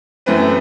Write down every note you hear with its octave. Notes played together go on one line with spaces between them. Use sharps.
F#2 E3 A3 C4 B4